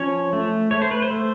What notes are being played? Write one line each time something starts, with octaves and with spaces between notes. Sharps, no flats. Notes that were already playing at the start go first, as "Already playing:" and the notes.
Already playing: F3 C#4 C#5
A3
A3 C#5
C5
B4
C5
A3